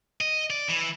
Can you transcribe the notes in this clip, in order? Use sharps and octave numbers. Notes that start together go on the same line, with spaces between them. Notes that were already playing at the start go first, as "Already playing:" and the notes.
D#5
D5
E3